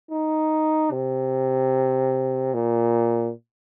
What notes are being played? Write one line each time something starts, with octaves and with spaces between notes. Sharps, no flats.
D#4
C3
A#2